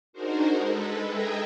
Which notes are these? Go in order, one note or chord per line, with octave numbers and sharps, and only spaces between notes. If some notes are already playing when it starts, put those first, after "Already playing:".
D4 D#4 F#4 G#4 A#4 C5
G#3 A4 B4
G#4 D#5 E5 G5 G#5 A#5